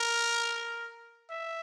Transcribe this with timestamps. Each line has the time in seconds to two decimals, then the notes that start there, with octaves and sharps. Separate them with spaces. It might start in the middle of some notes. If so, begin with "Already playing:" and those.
Already playing: A#4
1.30 E5